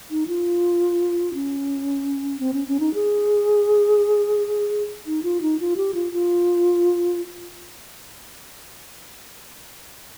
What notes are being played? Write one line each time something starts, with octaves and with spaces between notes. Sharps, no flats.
D#4
F4
C#4
C4
C#4
C#4
D#4
G#4
D#4
F4
D#4
F4
G4
F4
F4